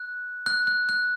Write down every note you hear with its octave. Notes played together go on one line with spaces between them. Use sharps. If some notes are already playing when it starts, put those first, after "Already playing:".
Already playing: F#6
F#6
F#6
F#6